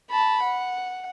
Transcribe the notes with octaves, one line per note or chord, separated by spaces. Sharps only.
A5 B5
F#5